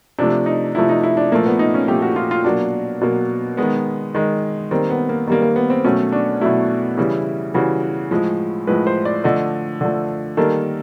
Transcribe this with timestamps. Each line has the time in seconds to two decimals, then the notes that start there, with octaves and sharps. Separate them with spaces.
0.19 C3 F3 A3 D4
0.46 D#4
0.75 C3 F3 A3 E4
0.89 D#4
1.03 E4
1.17 D4
1.32 A#2 F3 A3 A#3
1.46 B3
1.59 D#4
1.74 C#4
1.88 A#2 F3 A3 G4
2.02 F#4
2.16 F4
2.31 F4
2.44 B2 F#3 A#3 D4
3.01 B2 F#3 A#3
3.57 D#3 G#3 B3
4.15 D#3 G#3
4.71 D#3 G3 A#3 C4
4.90 B3
5.09 A#3
5.27 D#3 G3 A#3
5.42 A#3
5.56 B3
5.70 C4
5.85 B2 F#3 A3 C#4
6.12 D4
6.41 B2 F#3 A3 E4
6.97 C#3 E3 G3
7.54 C#3 E3 G3 F#4
8.11 A2 F3 G#3
8.67 A2 F3 G#3 B4
8.87 C5
9.05 D5
9.24 D3 F3 A3 D#5
9.81 D3 F3 A3
10.37 D#3 G3 A#3 A4